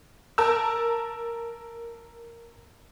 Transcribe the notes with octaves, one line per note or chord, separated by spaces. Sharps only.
A#4 A5 A#5 E6